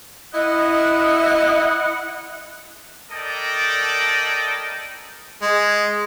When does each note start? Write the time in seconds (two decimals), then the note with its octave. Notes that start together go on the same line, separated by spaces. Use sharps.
0.34 E4 D#5 F#5
3.10 E4 A4 A#4 D5 D#5 G5
5.42 G#3